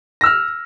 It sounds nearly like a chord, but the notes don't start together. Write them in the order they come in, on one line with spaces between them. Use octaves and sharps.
A#6 E6 F6